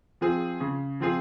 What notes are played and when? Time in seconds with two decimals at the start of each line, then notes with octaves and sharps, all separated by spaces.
0.21 F3 C4 F4 G#4
0.60 C#3
1.00 F3 C4 F4 G#4